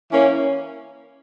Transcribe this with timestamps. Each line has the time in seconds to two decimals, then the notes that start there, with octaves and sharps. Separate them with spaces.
0.12 E3 A#3 C#4